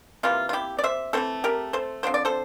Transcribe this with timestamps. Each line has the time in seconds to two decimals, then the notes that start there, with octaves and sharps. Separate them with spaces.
0.23 C3 E3 A#3 F4
0.49 F4
0.53 E4 G4
0.79 D5
0.84 C5 E5
1.13 E3 A3 C4 A4 C5
1.44 G4 A#4
1.73 A4 C5
2.03 D3 F3 C4 C5
2.14 D5
2.25 A4 C5